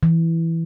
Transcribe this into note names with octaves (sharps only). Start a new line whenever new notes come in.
E3